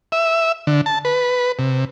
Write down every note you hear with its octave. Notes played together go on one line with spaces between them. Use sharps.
E5
D3
A5
B4
C3